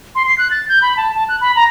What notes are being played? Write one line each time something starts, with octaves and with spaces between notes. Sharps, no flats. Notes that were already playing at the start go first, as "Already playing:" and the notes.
C6
C7
F#6
A6
G6
B5
A5
A5
F#6
B5
A#5